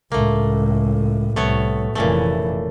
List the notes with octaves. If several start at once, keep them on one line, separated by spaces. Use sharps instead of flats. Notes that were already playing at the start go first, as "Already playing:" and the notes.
C#2 A2 A3 A#3
C2 A2 A3 B3 C#5
F1 A#2 C#3 E3 A3